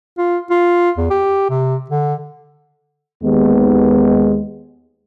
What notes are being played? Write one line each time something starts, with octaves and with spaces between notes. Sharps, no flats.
F4
F4
E2
G4
C3
D3
D#2 G#3 B3